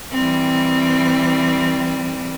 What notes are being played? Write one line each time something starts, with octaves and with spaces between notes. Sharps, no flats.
E3 G3 C4